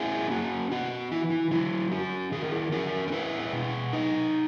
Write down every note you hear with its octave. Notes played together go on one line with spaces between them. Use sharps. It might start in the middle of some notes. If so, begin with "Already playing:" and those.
Already playing: C#4 E4 G#4
A#3 F#4
B3 F#4
E3 E4
E4
F#3 E4
C#4 F#4
D#3 G#4
A#4
E4 G#4
C#4 F#4 A#4
A#4
E4 G#4 B4
B2
D#4